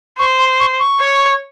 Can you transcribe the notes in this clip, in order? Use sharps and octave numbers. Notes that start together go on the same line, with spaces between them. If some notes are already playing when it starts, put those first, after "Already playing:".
C5 C#6
C6
C#6
C#6
C#5